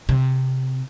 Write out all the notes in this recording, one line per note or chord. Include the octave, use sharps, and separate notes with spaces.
C3